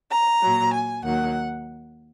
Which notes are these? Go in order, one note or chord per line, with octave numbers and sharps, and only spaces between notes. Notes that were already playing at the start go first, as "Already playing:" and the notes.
A#5
A#2 F#3
G#5
D#2 D#3 F#3 F#5